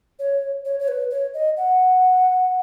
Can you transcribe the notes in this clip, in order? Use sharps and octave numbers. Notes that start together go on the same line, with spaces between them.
C#5
C#5
C#5
B4
C#5
D#5
F#5